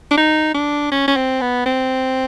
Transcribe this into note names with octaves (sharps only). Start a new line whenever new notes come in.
D4
D#4
D4
C#4
C#4
C4
B3
C4